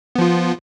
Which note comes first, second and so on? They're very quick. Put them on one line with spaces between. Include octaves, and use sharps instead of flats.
B3 F3 F4